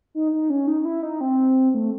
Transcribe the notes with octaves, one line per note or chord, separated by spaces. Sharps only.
D#4
D#4
C#4
D#4
D#4
E4
D#4
C4
A3